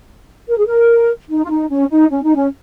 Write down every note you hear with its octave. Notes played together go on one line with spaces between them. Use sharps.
A#4
G#4
A#4
D#4
F4
D#4
C#4
D#4
C#4
D#4
C#4